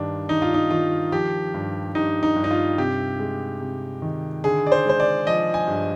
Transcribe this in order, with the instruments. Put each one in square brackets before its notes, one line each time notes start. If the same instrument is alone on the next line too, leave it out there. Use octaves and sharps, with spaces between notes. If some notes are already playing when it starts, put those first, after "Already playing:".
Already playing: [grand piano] G2 D#3 D4
D#3 D#4
F4
D#4
D#3 F4
F3 G4
G2
G2 D#4
D#4
G2
D#4
F4
C3 G4
G#3
C3
D#3
D3 G#4
D5
C5
G#3 C5
D5
F3 D#5
G#5
G2